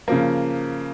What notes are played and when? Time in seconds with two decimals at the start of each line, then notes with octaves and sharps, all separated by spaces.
0.08 C#3 F3 A#3